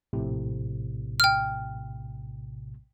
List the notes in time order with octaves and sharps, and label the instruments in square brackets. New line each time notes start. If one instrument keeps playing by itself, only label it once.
[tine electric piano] A#1 A2 C3
[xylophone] G5 F6